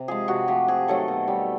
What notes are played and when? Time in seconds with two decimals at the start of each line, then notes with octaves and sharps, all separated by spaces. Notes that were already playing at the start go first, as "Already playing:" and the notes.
Already playing: C3
0.08 F3 G#3 G#4
0.28 C3 F#4
0.48 F3 A3 G4
0.68 C3 G#4
0.88 D#3 F#3 A3 A4
1.08 B2
1.28 G3